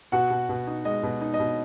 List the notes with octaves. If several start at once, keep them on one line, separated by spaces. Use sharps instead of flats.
B2 F#4 F#5
B2
B2
D#4
G#3 D#5
B2
D#4
D#5
B2